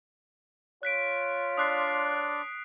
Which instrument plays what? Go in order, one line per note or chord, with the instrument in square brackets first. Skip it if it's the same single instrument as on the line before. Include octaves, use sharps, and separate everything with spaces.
[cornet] F4 [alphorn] C#5 [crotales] F#6 B6 D7
[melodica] D4 D5 C6 [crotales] D#6 F#6 C7